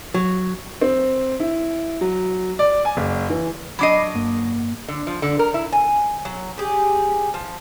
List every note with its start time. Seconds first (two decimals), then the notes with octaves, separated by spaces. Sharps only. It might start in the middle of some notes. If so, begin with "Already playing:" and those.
0.14 F#3
0.81 C4
1.40 E4
2.01 F#3
2.59 D5
2.85 G#5
2.97 F#1
3.30 E3
3.79 F#3 D4 D#5 B5 D6 C7
4.15 G2 A#3
4.88 D3
5.07 F3
5.22 D3
5.39 A#4
5.54 E4
5.72 G#5
6.25 F#3
6.58 G4 G#4
7.34 F3